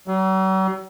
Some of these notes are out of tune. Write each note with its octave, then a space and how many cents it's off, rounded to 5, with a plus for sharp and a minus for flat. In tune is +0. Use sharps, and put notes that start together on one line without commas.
F#3 +45